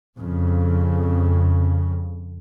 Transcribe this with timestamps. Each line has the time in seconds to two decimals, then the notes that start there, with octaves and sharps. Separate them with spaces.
0.17 F2 C#3